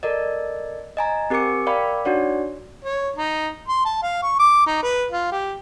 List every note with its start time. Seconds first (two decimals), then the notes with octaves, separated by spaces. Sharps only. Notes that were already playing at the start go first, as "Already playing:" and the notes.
0.03 A4 A#4 D5 D#5
0.97 D#5 G#5 A#5
1.30 C4 G4 A#4 G#5 D6 C#7
1.67 A#4 D5 F5 G5 B5 D6
2.05 D4 D#4 F#4 C#5 D5 F#5
2.84 C#5
3.16 D#4
3.68 C6
3.85 A5
4.03 F5
4.22 C#6
4.39 D6
4.67 D#4
4.83 B4
5.11 F4
5.31 G4